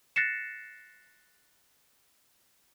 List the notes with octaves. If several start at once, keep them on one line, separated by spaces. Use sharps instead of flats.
F#6 A6 A#6 C7 C#7 E7